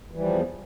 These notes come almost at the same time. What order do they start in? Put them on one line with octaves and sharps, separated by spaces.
E3 G3 F3 E2